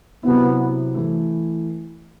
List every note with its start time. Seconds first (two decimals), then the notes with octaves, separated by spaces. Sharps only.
0.23 C3 F#3 B3 C4 E4
0.95 E3 A3 E4